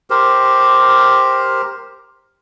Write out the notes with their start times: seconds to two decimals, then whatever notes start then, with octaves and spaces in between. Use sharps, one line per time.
0.10 G4 A#4 C5